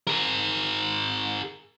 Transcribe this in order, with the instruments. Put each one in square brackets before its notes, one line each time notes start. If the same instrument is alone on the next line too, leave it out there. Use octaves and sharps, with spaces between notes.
[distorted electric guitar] G#4 A#4